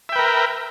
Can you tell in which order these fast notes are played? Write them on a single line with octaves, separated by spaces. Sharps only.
E5 G5 B4 A#4